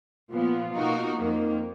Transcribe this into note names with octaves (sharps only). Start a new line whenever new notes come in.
A#2 F3 B3 F4
B2 A#3 D#4 F#4 A#4
F2 D#3 A#3 D#4